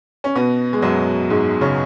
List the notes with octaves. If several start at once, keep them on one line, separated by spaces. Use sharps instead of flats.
C#4
B2 B3
G#3
F#2 F#3
G#2 G#3
C#3 C#4